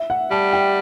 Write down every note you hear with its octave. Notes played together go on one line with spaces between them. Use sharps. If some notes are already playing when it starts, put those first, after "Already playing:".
Already playing: E5
F#5
G3 A5
G5